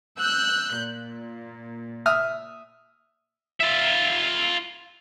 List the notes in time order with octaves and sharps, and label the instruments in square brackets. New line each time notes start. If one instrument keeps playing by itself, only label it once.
[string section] E6 F#6 G6
A#2
[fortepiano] E5 D#6 F6
[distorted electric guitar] F4 E5